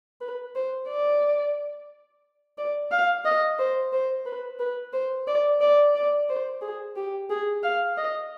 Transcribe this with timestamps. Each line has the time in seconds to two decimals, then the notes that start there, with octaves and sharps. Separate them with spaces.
0.21 B4
0.55 C5
0.89 D5
2.58 D5
2.91 F5
3.25 D#5
3.59 C5
3.93 C5
4.26 B4
4.59 B4
4.93 C5
5.27 D5
5.61 D5
5.95 D5
6.29 C5
6.61 G#4
6.96 G4
7.30 G#4
7.63 F5
7.97 D#5